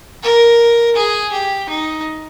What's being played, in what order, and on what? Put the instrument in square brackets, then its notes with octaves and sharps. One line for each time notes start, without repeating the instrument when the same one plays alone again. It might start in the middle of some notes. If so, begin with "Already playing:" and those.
[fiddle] A#4
G#4
G4
D#4